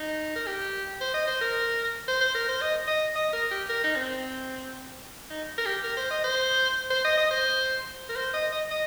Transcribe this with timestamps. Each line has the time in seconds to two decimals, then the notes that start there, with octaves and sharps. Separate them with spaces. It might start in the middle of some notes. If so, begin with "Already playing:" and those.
Already playing: D#4
0.36 A#4
0.46 G4
1.01 C5
1.14 D#5
1.27 C5
1.41 A#4
2.08 C5
2.21 C5
2.35 A#4
2.48 C5
2.61 D#5
2.87 D#5
3.15 D#5
3.33 A#4
3.51 G4
3.69 A#4
3.84 D#4
3.96 C4
5.30 D#4
5.58 A#4
5.66 G4
5.83 A#4
5.97 C5
6.10 D#5
6.24 C5
6.90 C5
7.04 D#5
7.17 D#5
7.31 C5
8.09 A#4
8.16 C5
8.34 D#5
8.52 D#5
8.71 D#5